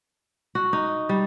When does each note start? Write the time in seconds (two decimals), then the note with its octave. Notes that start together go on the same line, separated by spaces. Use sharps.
0.55 F#4
0.73 D#4
1.09 G3